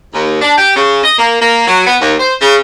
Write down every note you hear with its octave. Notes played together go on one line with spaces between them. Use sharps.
D#2
D4
G4
C#3
D#5
A#3
A#3
F#3
B3
D#2
C5
C#3